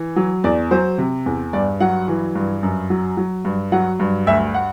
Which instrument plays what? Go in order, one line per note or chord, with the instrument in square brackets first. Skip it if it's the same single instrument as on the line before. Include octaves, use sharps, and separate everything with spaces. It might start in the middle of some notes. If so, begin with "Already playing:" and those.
Already playing: [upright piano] E3
F#3
E2 D5
F#3 C5
C3
E2
G2 D5
F#3 F#5
E3
G2
F#2
F#3
F#3
G2
F#3 F#5
G2
D2 E5
F#5